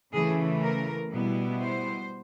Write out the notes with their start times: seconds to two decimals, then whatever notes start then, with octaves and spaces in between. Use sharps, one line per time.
0.13 C#3 E3 A3 G#4
0.62 A#4
1.11 B2 G3 B3 E4
1.59 C5